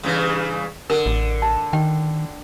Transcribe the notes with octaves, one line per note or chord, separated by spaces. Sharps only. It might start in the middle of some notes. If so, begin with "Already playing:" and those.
G2 C#3 E3
D3 A#4
A1
A5
D#3 G5